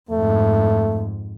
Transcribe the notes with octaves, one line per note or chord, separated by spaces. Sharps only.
F2 G#2 A3